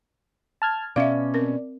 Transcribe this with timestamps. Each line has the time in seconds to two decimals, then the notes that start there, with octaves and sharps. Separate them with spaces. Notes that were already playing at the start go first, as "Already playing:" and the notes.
0.62 A5 F6 G#6
0.96 B2 C#4 D5 E5 F5
1.34 C4 A#4